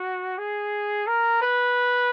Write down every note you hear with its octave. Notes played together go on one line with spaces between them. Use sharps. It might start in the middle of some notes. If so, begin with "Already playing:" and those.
Already playing: F#4
G#4
A#4
B4